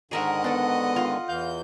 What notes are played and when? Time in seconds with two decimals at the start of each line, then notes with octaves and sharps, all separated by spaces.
0.11 G#2 D3 D#3 G#4 A#4 D#5 E5 F#5
0.44 B3 D4 A4
0.96 F4
1.29 E2 E3 F5 G6